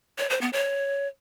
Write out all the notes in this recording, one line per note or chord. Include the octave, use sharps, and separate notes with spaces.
C#5
C5
B3
C#5